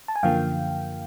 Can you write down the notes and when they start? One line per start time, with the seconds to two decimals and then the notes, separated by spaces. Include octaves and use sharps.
0.08 A5
0.16 G#5
0.23 F#2 D3 F3 A#3 F5 G5